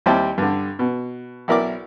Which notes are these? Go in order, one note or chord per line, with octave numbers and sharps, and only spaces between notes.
D#2 G3 C4 E4 G5 A5
G2 D3
B2
B1 E4 A#4 D5 D6